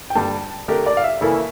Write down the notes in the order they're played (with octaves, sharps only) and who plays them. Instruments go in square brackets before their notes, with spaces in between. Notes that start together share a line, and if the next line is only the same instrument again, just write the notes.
[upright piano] G5
[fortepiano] G2 D3 G3 [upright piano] A5
[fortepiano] D3 A3 D4 G4 A#4
[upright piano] D5
F5
E5
[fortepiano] C#3 E3 A#3 E4 A4